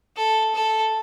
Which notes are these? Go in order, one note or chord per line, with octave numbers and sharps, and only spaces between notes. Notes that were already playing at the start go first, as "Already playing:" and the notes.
A4
A4